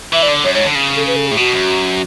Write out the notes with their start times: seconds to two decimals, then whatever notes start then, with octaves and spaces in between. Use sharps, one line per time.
0.13 E3 E5
0.23 D5
0.28 D3
0.44 F#2 C#5
0.55 G#2 C#5
0.65 D3
0.75 C#3
0.96 A4
1.07 B4
1.16 A4
1.27 A2 G#4
1.37 B2 F#4
1.53 F#2